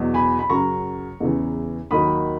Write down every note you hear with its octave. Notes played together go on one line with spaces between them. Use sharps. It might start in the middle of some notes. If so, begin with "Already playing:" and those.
Already playing: E2 B2 F#3
G#5 B5
B5
F#2 C#3 F#3 A#5 C#6
E2 C#3 E3
D#2 D#3 F#3 B5 D#6